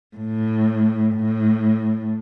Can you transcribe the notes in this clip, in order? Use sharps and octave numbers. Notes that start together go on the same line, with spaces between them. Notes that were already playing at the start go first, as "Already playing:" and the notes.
A2
A2